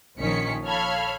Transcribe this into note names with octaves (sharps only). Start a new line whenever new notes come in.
A#1 D#3 F3 C#4 B6 C#7
A4 C#5 F5 B5 F6 G#6